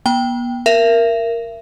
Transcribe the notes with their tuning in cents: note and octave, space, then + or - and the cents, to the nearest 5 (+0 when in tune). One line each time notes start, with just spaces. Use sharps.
B3 -45 G5 +0
A#4 +0 E5 +35